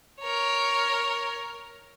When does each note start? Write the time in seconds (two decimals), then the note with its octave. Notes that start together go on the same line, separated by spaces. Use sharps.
0.20 A#4 C#5